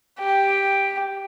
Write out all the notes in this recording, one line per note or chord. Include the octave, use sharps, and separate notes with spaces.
G4